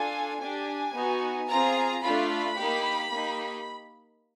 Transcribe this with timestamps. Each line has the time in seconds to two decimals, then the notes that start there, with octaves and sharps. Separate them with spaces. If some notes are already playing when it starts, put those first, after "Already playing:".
Already playing: D4 F4 A4 G#5
0.41 D4 G4 G#5
0.95 B3 D#4 F#4
1.49 C4 F4 G#4 A#5
2.03 A3 D4 F4 B5
2.57 A#3 D#4 G4
3.12 A#3 D#4 G4